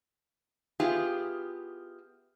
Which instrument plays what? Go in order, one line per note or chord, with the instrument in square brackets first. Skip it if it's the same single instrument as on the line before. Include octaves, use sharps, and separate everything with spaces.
[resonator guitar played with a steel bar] B3 E4 F4 G4 G#4